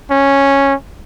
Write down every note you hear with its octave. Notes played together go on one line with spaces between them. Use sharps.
C#4